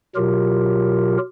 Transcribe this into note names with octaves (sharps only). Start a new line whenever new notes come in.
B2 F#3 F4 G4 A#4